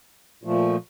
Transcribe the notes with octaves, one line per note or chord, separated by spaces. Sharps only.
A#2 F3 A3